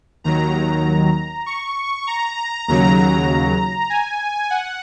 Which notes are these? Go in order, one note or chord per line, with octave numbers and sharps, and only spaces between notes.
D#2 D#3 F#3 A#5
C#6
A#5
D#2 C#3 F#3 A#5
G#5
F#5